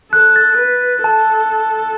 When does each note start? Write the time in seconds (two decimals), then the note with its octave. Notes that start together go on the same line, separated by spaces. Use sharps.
0.12 A4 F#6
0.36 A6
0.58 B4
1.04 A4 A5